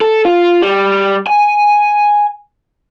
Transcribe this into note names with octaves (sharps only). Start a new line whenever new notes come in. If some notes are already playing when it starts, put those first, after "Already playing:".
A4
F4
G3
G#5